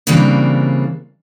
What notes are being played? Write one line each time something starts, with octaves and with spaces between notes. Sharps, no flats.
C#3 E3 G3 A#3 C4 D4